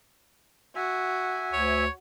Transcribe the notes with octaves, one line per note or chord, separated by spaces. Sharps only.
F#4 E5 G#5
D2 C#5